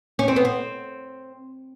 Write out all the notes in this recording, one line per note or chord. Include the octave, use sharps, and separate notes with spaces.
C#4
C4
B3
C4